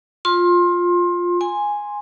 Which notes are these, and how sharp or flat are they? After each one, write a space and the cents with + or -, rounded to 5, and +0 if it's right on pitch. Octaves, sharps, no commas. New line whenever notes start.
F4 +10 C6 +25
G#5 -5 C6 +0